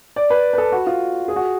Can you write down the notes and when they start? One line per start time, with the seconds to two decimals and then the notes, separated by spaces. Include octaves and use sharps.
0.16 D5
0.30 B4
0.53 B4
0.58 A4
0.72 F#4
0.87 F4
1.28 G#4
1.36 F#4